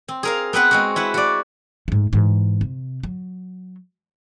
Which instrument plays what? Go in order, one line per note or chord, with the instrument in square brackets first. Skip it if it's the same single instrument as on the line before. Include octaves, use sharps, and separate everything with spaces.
[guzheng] C4
G#4 A#4 F5
B3 C4 B4 F#5
G#3 C4 F#4
E4 B4 F#5
F#4 D5
[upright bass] G#2 A3
G#2 E3
C3
F#3